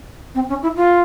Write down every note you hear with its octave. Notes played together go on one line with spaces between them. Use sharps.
C4
C#4
E4
F4